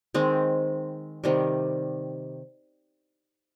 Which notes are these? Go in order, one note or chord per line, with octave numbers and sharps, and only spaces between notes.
D#3 G#3 C4
C3 D#3 G3